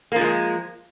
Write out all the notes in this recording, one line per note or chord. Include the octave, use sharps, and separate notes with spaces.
F3 G#3 A#3